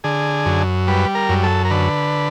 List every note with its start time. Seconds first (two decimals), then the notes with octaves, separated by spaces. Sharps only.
0.04 D3 G#4
0.46 F#2
0.87 G3 B4
1.15 A#4
1.29 F#2
1.43 A4
1.65 A#4
1.71 D3 B4